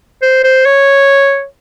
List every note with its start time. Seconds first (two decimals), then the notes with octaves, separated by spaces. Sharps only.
0.22 C5
0.44 C5
0.66 C#5